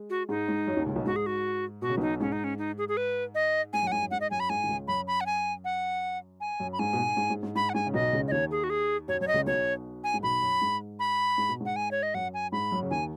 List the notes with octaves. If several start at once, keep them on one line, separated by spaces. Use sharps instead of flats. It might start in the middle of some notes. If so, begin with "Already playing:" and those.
Already playing: G#3
F#4
G#2 G#3 D#4
G#2 G#3
F#2 F#3
D#2 D#3
C#2 C#3
B1 B2
G#2 F#4
G#4
F#4
B2 F#4
C#3
B1 B2 D#4
G#2 C#4
D#4
C#4
D#4
G#4
G#4
B4
D#5
G#2 G#5
F#2 F#5
G#2 G#5
F#2
G#2 F#5
D#5
F#2 G#5
B5
G#2 G#5
D#3
C#2 C#3
F#2 F#3 B5
B5
F#5
G#5
F#5
G#5
F#2
B5
G#2 G#5
B2
G#2
G#2
G#2
G#2
G#2 B5
F#5
G#2 G#5
C#3
B1 B2 D#5
C#2 C#3
D#5
D#2 D#3 C#5
G#4
F#4
G#4
F#2 F#3 C#5
F#2 F#3 C#5
D#5
C#2 C#3
B1 B2 C#5
G#5
G#2
B1 B2 B5
F#2
G#2
B5
G#2
B2
G#2 F#5
G#5
C#5
D#5
F#2 F#5
G#5
G#2 B5
F#2 F#3
C#3
D#2 D#3 G#5